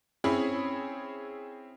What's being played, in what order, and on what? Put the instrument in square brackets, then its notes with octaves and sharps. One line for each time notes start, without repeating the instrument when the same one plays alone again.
[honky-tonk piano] C4 C#4 E4 G#4 B5